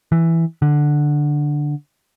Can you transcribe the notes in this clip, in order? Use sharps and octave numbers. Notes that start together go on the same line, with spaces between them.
E3
D3